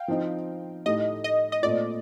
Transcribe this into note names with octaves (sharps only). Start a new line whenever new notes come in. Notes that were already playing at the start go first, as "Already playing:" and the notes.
Already playing: F5 G5
F3 C4 D#4
A2 A3 D#4 G4 D#5
D#5
D#5
A#2 A3 C4 F4 D5